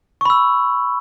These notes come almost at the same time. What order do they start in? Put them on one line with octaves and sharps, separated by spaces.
C#6 B5 E6